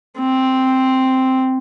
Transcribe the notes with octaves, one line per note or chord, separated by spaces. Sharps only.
C4